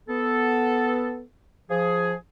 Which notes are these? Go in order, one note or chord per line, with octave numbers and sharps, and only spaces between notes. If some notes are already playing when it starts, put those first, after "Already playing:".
B3 A4
F3 G#4